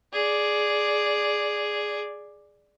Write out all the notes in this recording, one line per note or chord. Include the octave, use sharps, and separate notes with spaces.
G#4 D5